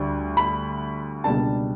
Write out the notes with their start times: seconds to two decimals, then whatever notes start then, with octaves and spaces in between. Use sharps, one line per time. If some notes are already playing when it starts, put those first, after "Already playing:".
Already playing: D2 D3 G3
0.37 B5
1.24 C#2 B2 G3 A#3 D4 A5